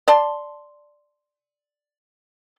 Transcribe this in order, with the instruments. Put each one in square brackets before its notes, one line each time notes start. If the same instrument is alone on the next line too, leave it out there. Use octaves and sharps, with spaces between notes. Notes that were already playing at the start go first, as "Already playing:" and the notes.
[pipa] D5 A5 C6